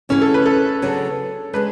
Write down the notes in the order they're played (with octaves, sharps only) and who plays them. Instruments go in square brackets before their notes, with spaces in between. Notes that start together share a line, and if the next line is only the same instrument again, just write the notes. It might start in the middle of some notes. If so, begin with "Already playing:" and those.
[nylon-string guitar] D2 C#3 E3 B3 E4 [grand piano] C#4
[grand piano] A4
B4
A4
[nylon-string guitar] C#3 F#3 B3 D4
[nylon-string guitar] C#3 G#3 D4 [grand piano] B4